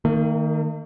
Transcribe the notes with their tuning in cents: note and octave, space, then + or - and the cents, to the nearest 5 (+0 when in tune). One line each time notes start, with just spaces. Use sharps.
D#3 +0 A#3 -45